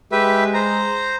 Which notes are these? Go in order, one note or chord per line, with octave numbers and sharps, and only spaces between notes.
G#3 G4 B4 E5
C5 A#5